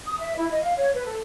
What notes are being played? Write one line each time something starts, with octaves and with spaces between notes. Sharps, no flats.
D#6
E5
E4
D#5
F5
C#5
B4
A4